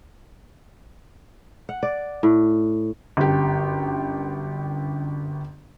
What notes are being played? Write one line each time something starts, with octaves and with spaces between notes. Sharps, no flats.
F#5
D5
A2
G1 F#2 G4